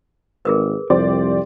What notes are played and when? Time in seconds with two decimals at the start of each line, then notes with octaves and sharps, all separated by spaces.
0.45 G#1 G#4 A#4 B4
0.90 C2 F2 G4 C5 D5